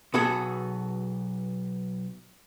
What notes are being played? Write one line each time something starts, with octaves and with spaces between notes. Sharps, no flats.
B1 B3 F#4 G#4 A4